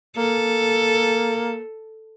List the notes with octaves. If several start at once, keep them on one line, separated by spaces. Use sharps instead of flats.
A#3 A4